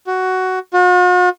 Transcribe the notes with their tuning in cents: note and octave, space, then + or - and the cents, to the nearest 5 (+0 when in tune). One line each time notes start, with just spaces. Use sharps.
F#4 +10
F#4 -45